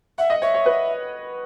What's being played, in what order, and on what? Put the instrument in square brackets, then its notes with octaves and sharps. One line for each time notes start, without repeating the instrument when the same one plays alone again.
[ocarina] E5 [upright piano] F#5
[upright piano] D#5
[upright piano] C#5 [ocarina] E5
[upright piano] C#5
B4